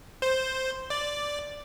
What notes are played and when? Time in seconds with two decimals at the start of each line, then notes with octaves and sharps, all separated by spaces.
0.22 C5
0.90 D5